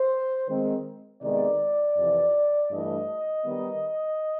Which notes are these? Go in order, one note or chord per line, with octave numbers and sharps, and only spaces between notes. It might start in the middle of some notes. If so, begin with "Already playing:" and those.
Already playing: C5
D#3 G#3 C4
C3 D#3 G#3 B3 D5
F2 C3 E3
G2 E3 A3 D4 D#5
D#3 G3 B3 D#4